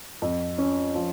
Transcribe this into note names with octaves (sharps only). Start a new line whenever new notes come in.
F2
C#4
F3